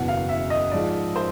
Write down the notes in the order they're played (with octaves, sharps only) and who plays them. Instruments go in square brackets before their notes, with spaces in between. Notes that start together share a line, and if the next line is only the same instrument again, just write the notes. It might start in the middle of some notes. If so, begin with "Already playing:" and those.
Already playing: [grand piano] F#1 E2 B2 F#3 [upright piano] F#5
[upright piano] F5
E5
D#5
[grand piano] G#2 F3 G#3 [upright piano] D5
[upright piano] C5